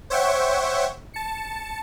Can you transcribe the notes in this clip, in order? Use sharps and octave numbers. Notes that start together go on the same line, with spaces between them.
C5 C#5 E5 F#5 G5 C#6
A5 C#7